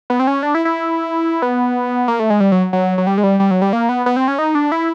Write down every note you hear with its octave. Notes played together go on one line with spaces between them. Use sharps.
B3
C4
C#4
D4
E4
E4
B3
A#3
A3
G#3
G3
F#3
F#3
F#3
G3
G#3
G3
G3
F#3
G3
A#3
B3
B3
C4
C#4
D#4
D4
E4